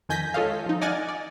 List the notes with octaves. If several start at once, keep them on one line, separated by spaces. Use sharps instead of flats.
F2 D#3 G#5 G6 A#6 B6
G#3 F4 A4 C#5 D#5 F5
F3 D#4
D5 D#5 F#5 G#5 F6 A6
D5